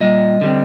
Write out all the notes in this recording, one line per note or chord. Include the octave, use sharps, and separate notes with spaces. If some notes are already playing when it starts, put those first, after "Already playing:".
A#2 G3 D#5
D3 G3 C4